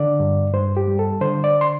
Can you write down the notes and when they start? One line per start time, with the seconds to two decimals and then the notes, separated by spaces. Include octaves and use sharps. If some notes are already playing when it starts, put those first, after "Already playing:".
Already playing: D3 D5
0.20 G2
0.53 G2 C5
0.77 G4
0.88 G3
0.99 A4
1.21 D3 C5
1.44 D5
1.61 C6